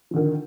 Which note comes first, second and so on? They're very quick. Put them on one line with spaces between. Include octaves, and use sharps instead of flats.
F3 D3 D#3